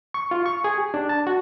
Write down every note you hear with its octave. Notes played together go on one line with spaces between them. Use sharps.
C#6
F4
C#6
G#4
G4
D4
A5
F#4